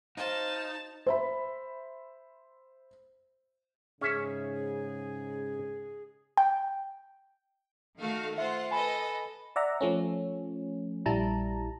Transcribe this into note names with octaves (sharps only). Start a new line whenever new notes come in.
D#4 F#4 C5 F5 A5
C5 E5 B5
G#2 C#3 C#4 G#4 C#5 E5
G5
D#3 A3 F#4 F5
F4 C5 E5 F#5
A4 B4 D#5 G#5 B5
D5 E5 F#5 A#5
F3 A3 C#4
A#1 G3 E4 A5 A#5